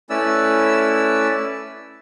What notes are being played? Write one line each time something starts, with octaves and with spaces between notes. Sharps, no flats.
A3 C#4 E4 B4 D5 E6